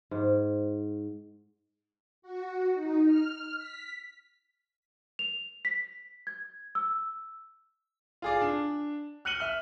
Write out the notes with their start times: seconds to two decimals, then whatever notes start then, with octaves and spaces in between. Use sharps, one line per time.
0.11 G#2
2.22 F#4
2.74 D#4
3.06 F6
3.57 B6
5.19 F7
5.65 B6
6.27 G#6
6.75 E6
8.22 F4 G#4 D5
8.42 D4
9.25 F6 F#6 C#7 D#7 F#7 G7
9.40 E5 F6